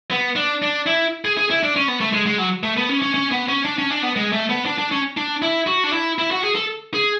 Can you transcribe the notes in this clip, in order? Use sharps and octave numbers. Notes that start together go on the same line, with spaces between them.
B3
D4
D4
E4
G#4
G#4
E4
D4
C#4
B3
A3
G#3
G#3
F#3
A3
B3
C#4
C#4
C#4
B3
C#4
D4
C#4
D4
B3
G#3
A3
B3
D4
D4
C#4
D4
E4
F#4
D4
E4
E4
F#4
G#4
A4
G#4